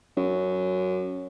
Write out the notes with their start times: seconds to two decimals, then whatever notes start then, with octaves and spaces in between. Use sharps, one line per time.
0.17 F#2